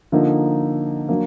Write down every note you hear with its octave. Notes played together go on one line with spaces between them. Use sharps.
D3 F3 A#3 D#4
F#3 A#3 D4